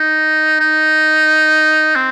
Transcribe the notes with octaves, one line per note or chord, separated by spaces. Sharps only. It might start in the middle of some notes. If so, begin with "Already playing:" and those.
Already playing: D#4
D#4
C4